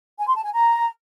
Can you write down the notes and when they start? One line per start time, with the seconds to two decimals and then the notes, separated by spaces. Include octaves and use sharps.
0.18 G#5
0.26 C6
0.35 A5
0.43 G#5
0.52 A#5